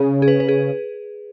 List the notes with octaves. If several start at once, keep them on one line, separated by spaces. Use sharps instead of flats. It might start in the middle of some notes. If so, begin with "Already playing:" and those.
Already playing: C#3 G#4
G#4
B4
B4
G#4